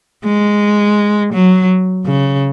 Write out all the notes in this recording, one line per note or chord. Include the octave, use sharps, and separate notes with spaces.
G#3
F#3
C#3